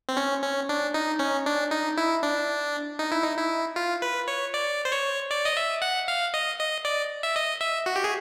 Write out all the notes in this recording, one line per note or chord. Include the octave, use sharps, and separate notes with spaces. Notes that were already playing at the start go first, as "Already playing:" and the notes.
C4
C#4
C#4
D4
D#4
C#4
D4
D#4
E4
D4
D#4
E4
D#4
E4
F4
B4
C#5
D5
C5
C#5
D5
D#5
E5
F#5
F5
D#5
D#5
D5
E5
D#5
E5
F#4
G4
G#4